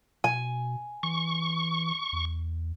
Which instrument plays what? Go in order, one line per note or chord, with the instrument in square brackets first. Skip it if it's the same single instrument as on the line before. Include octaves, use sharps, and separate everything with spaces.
[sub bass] B2 [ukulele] G#5
[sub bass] E3 [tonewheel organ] C#6
[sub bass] E2